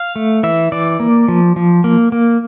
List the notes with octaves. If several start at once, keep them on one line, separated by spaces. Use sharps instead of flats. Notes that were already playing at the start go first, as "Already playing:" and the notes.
Already playing: F5
A3
E3 E5
E3 D5
A#3
F3
F3
A#3
A#3